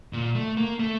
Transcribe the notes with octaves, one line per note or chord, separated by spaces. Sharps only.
A#2
A3
A#3
A3